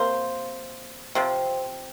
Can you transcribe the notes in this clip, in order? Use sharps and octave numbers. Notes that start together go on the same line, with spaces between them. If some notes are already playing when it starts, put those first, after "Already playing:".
Already playing: C3 A#3 C5
C3 F3 C4